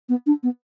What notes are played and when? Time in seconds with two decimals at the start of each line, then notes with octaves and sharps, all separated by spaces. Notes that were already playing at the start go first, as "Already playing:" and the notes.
0.09 B3
0.26 D4
0.43 B3